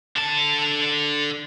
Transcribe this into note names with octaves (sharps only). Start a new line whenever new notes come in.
D3 A5